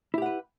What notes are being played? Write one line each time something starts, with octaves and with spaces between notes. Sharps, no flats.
E4 G4 B4 F#5